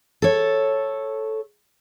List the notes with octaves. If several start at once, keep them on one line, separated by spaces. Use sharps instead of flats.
A4 C#5